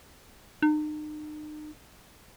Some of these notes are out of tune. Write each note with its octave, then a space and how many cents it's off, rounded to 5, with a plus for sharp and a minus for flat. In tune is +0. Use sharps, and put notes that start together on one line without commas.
D#4 -40